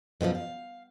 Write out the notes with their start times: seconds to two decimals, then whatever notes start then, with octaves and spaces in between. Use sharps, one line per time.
0.21 F#2 B2 D#3 F3
0.35 F5